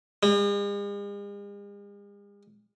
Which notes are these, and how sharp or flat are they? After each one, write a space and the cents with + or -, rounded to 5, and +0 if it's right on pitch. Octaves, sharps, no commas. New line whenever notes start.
G#3 -45